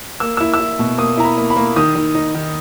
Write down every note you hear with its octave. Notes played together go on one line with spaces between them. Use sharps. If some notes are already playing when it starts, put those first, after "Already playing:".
A#3 E6
E4 E6
E6
E4
B2
A#3 D#6
E4 A#5
B5
A#3
B5
A#3
D#3 D#6
D#3
D#4
D#3